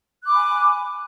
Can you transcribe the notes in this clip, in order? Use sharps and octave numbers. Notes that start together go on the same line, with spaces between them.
G#5 B5 D6 F#6